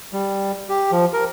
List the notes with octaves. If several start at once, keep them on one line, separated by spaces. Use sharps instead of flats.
G3
G4
F3
A#4